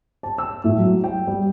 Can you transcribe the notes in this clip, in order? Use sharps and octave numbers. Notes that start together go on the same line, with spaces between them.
A5
E6
A2
F#3
G5
G3